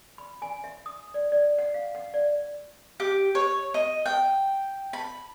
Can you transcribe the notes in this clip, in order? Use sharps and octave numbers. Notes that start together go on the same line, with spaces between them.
B5
G#5
E5
D#6
D5
D5
F#5
F5
F#5
D5
G4
C#5
D#5
G5
B5